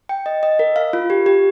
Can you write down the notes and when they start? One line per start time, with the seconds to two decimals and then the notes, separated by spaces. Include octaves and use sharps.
0.09 G5
0.26 D#5
0.43 D#5
0.59 A#4
0.76 F5
0.93 F4
1.10 G4
1.26 G4